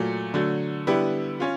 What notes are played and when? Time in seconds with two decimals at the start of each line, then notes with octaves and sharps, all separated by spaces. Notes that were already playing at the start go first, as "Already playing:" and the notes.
Already playing: A#2 F#3 A3
0.34 D3 F#3 A3
0.87 D3 G3 B3 E4 G4
1.40 C#4 F4